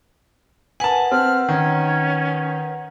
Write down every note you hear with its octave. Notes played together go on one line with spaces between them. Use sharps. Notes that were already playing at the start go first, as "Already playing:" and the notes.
A#4 B4 F#5 G#5 A5
C4 F6
D#3 C#4